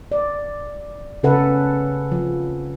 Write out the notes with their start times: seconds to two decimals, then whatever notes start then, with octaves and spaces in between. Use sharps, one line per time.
0.12 D5
1.23 C#3 C#4 A4 B4 F#5
2.12 F3